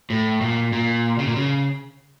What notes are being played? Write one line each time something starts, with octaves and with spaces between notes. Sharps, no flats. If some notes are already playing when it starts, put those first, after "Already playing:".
A2
A#2
A#2
C#3
A#2
C#3